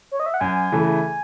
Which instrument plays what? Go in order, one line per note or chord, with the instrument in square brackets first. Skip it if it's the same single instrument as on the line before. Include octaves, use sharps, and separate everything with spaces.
[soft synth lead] C#5
D#5
E5
F#5
[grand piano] F#2 [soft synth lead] G#5
[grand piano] C#3 E3 A3